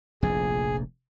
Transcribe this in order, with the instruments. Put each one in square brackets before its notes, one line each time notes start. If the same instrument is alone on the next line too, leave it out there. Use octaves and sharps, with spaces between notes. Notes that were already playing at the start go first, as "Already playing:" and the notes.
[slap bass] F1 A#1 F2 [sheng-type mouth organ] G#4